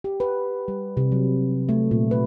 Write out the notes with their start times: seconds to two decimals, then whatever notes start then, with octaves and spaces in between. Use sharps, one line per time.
0.04 G4
0.20 B4
0.68 G3
0.97 C3
1.12 F#3
1.69 A3
1.91 A#2
2.11 B4